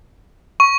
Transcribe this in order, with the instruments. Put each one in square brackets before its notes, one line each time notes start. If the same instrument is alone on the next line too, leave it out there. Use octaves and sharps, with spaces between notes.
[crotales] C#6